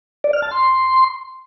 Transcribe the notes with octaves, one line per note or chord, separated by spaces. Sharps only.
D5
F6
A5
C6